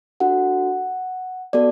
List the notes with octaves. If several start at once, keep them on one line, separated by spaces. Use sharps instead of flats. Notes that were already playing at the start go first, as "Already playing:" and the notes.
D4 F#4 A4 F#5
B3 F#4 A4 D5